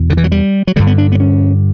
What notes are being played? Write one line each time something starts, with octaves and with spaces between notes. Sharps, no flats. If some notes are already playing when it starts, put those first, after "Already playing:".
Already playing: E2 B2
D3
E3
F#3
G3
F#3
G2 D3 G3
B3
D4
B3
C#4